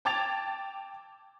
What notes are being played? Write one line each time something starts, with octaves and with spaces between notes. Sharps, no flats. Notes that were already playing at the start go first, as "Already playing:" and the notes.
G5 A5 D6 G#6 A6 F7